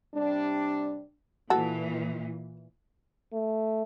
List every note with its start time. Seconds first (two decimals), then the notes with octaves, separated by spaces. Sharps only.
0.15 C3 G3 D4
1.50 A#2 E3 F#4 A4
3.33 A3